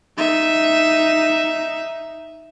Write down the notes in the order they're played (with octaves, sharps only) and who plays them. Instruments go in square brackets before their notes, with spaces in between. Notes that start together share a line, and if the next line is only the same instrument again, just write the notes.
[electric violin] D#4 E5